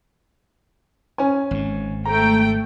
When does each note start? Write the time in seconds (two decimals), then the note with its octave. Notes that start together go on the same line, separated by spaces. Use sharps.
1.18 C#4 G#5
1.51 G#1 G#2
2.05 A3 G5 A#5